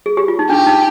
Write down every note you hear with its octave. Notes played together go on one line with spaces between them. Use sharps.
G#4
G4
F4
D#4
D4 G4
D#4